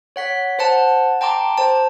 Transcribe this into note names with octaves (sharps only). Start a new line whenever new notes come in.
C#5 F#5 B6
C5 F#5 A5
G5 A5 A#5 C6 D6
C5 A5